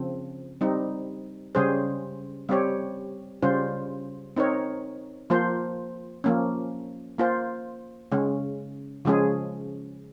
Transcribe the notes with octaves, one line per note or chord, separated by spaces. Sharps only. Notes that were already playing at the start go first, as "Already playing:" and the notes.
Already playing: C#3 F3 C4
G3 C4 D#4
C#3 G3 C#4 G#4 C5
G3 C4 G4 C#5
C#3 G3 C#4 F4 C5
C4 D#4 A#4 C#5
F3 A#3 F4 C5
F3 A#3 C#4
A#3 F4 C5
C#3 G#3 C#4
C#3 F3 G#3 C#4 G#4